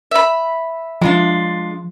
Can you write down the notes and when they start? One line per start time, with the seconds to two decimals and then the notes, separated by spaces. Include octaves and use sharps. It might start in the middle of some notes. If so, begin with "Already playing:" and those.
0.11 E5 B5
1.01 F3 G#3 D4 F4